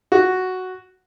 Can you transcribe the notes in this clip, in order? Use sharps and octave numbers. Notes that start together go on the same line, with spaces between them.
F#4